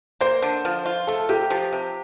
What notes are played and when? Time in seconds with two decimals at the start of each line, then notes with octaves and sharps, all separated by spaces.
0.21 A#3 C5
0.42 D3
0.65 F3
0.86 F4
1.07 A3 A4
1.29 C3 G4
1.50 F3
1.73 C3